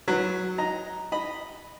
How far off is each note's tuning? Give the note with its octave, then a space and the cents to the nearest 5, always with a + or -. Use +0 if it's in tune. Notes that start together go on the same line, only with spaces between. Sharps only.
F#3 -5 B4 +0
D#5 +5 A#5 +0
D#5 -10 B5 -5